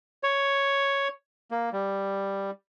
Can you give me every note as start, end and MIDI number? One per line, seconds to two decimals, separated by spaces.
0.23 1.08 73
1.51 1.69 58
1.73 2.51 55